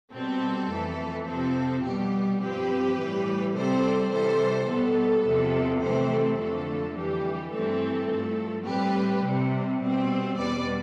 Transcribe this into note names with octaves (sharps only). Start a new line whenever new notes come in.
B2 G3 C4 A4
F2 E3 A3
F2 C3 F3 C4 A4
B2 G3 B3 G4
G2 F3 C4 G4 B4
A2 E3 G3
C3 G3 C4 A4 C5
C3 E3 G3 A4 C5
B2 G3 B3 A4
E2 C3 F3 B3
C3 E3 A3 C4 A4 C5
A4
F2 D3 F3 A3 A4
F2 E3 G3 G4
G2 E3 A3 C4 A4
G2 F3 A3
A2 G3 C4 G4 B4
C3 G3 C4
B2 G3 C4
E2 B2 G3 B4 D5